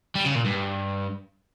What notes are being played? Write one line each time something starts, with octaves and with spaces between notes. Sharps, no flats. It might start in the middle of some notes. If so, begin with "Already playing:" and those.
G3
C#3
A#2
G2